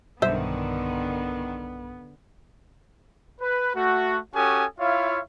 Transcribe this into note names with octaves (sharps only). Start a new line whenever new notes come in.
B1 G2 D3 D#3 B3 C5 E5
B4
A3 F#4
C#4 F#4 G4 A4 G#5 D#6
E4 F4 C#5 E5 F5